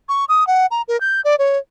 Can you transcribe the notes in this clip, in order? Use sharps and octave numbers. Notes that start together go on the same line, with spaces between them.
C#6
D#6
F#5
A#5
A#4
G6
D5
C#5